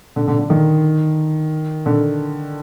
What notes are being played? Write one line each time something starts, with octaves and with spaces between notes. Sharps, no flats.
D3
D3
D3
D#3
D3